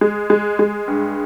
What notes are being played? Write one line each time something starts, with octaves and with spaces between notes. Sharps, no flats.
G#3
G#3
G#3
G2